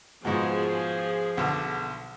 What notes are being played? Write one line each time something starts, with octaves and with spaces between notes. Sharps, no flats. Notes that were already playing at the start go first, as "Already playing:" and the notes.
G#2 B2 F3 G#4
B1 D3